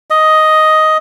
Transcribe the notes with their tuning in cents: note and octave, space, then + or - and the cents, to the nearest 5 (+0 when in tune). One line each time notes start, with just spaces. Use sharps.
D#5 +5